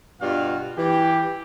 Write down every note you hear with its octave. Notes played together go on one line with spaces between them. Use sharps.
G2 B2 G3 F4 F#4 F5
E3 G4